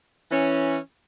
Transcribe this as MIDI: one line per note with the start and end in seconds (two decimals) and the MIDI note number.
0.31 0.76 52
0.31 0.76 61